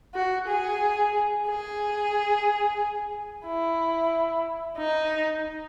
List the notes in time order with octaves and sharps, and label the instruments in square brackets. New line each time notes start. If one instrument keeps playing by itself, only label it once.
[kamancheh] F#4
G#4
G#4
E4
D#4